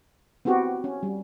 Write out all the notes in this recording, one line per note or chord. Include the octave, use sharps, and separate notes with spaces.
B3 C4 E4 F#4 G4
C#4
G3